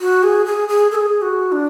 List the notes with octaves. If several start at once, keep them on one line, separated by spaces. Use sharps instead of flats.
F#4
G#4
G#4
G#4
A4
G#4
F#4
D4